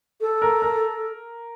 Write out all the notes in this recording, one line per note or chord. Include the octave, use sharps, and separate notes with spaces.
A4
A#4
A#4